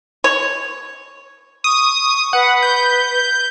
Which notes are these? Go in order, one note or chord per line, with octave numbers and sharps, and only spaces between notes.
C#5
C#6 D#6
B4 F#5
G6